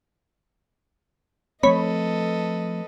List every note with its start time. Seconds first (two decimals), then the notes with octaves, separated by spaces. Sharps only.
1.63 F3 A3 C4 A4 B4 C#5 D#5 B5